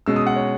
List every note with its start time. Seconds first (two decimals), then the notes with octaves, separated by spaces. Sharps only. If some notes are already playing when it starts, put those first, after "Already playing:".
0.06 B2 G#3 C#4 E6
0.16 D#6
0.27 F#5
0.36 C#5